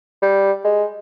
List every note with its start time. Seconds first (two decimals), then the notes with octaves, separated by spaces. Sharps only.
0.22 G3
0.65 G#3